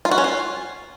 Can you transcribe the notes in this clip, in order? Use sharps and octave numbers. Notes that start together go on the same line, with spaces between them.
F4
F#4
C#4
F4